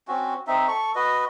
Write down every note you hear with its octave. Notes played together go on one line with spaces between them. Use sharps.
C4 C#4 F#4
C4 D#4 E5
A4 C#6
F#4 B4 D#5